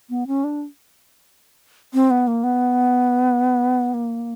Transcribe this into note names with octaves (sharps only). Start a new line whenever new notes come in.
B3
C#4
D4
C4
B3
A#3
B3
A#3